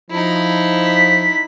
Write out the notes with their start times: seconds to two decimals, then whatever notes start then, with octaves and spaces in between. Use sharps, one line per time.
0.11 F3 D#4 E4
0.83 B6